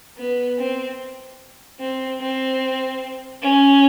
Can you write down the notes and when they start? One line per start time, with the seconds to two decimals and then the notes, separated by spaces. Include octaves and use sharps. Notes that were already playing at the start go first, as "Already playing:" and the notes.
0.18 B3
0.58 C4
1.80 C4
2.20 C4
3.42 C#4